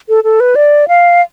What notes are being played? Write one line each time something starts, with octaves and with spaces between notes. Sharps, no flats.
A4
A4
B4
D5
F5